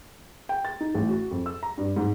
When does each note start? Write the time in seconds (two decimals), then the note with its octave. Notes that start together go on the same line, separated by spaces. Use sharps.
0.49 G5
0.65 A6
0.81 D#4
0.95 A1
1.09 F#4
1.31 F2
1.46 E6
1.63 A#5
1.78 G2
1.96 G#2